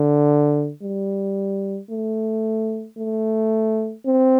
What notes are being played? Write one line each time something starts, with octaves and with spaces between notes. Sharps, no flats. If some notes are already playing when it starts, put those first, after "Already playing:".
Already playing: D3
G3
A3
A3
C4